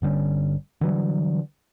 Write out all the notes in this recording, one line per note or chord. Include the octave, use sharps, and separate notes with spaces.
G1 D3 G3 C#4
D3 E3 F#3 G3